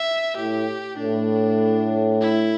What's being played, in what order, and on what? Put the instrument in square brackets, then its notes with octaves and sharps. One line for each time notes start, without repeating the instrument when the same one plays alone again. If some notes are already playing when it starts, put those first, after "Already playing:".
Already playing: [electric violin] E5
[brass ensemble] A2 [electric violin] G4
[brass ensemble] A2 [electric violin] D4
[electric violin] E4